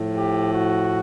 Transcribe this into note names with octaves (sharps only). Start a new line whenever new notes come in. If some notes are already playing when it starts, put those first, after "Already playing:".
Already playing: A2 F3
G4
F#4